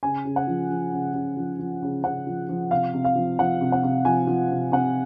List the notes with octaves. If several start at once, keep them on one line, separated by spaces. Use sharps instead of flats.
C#3 G#5
C#3
F#5
F3
F3
C#3
C#3
F3
F3
C#3
C#3 F#5
F3
F3
C3 F5
C3
F5
F3
F3 F#5
C3
F#5
C3
F3 G#5
F3
C3
C3 F#5